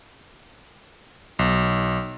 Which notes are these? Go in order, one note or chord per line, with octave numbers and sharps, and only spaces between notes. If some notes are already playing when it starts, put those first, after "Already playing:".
B1